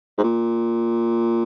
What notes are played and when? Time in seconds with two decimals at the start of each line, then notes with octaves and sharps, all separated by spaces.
0.18 G#2
0.24 A#2